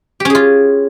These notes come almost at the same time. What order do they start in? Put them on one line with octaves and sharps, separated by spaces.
G4 C#4 G#4 F4